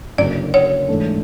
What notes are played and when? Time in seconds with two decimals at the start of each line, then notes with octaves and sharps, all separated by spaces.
0.18 F#1 F#2 D3 D5
0.54 C#5
0.88 G#2 E3 A3 D4